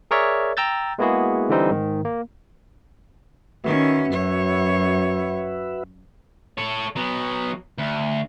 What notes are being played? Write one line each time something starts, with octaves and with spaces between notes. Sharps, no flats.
G#4 A#4 C#5 D5 E5
G5 A#5 E6 G6 A6
G#3 A#3 B3 E4 F#4 G#4
D3 E3 G3 C4 D#4
G#2 D#3
A#3
D#3 C#4 F#4 B4 E5
F#2 C#5
A4 C#5
F#3 B3
D2